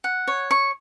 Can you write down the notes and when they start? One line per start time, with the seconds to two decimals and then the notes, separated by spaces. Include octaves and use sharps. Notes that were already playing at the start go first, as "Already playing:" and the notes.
0.04 F#5
0.27 C#5
0.51 C#6